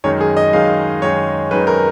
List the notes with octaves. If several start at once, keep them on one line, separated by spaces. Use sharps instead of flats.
F#2 D#3 G#3 D#4 C#5
G#4
D#5
F#2 D#3 G#3 D#4 F5
F#2 D#3 G#3 D#4 C#5
F#2 D#3 G#3 D#4 B4
A#4